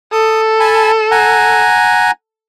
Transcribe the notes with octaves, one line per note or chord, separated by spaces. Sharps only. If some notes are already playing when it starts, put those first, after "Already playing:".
A4 D#6
G#5 A5 B5
F#5 G#5 A#5